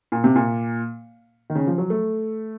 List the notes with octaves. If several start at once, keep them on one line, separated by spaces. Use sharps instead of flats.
A#2
C3
A#2
D#3
C#3
F3
F#3
A3